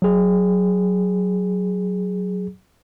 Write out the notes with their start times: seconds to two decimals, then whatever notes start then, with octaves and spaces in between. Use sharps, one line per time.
0.02 F#3 G#4